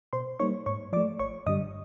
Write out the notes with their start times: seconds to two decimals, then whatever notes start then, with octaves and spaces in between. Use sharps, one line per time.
0.13 B2 C5 C6
0.40 G3 A#3 D#4 C#5 C#6
0.66 G#2 C#5 C#6
0.92 F3 D5 D6
0.97 A3
1.19 G#1 C#5 C#6
1.46 G2 D3 G3 D#5 D#6